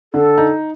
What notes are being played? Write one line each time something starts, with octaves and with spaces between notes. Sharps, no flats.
D3 A4
D#4